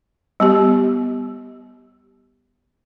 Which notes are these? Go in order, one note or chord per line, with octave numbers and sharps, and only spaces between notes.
G3 B3 G4